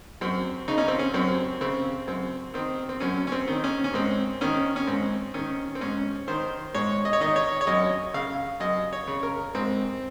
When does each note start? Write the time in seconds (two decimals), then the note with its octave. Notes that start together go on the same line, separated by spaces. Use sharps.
0.21 F#2 C4
0.68 C#3 D#4
0.78 C#4
0.88 C4
0.99 C#4
1.14 F#2 C4
1.61 C#3 C4
2.07 F#2 C4
2.54 D#3 C4
2.89 C4
3.00 F#2 C#4
3.27 C#4
3.32 C4
3.48 D#3
3.64 C#4
3.84 C#4
3.94 G#2 C4
4.41 D#3 C#4
4.76 C#4
4.87 G#2 C4
5.34 D#3 C#4
5.75 C4
5.81 G#2 C#4
6.28 D#3 C5
6.74 G#2 C#5
7.05 D#5
7.13 C#5
7.21 D#3 D#5
7.36 C#5
7.61 C#5
7.67 F#2 D#5
8.14 C#3 F5
8.60 F#2 D#5
8.93 C#5
9.08 C#3
9.23 A#4
9.55 G#2 C4